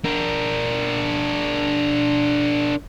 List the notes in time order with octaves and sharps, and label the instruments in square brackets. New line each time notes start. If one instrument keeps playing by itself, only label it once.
[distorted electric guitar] D4 A#4